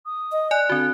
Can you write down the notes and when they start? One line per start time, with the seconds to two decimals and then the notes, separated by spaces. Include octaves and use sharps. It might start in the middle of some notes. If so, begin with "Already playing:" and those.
0.06 D#6
0.32 D#5
0.51 D5 G#5 F#6
0.69 D3 C4 F#4